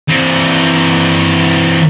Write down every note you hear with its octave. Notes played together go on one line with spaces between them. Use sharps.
E3 C4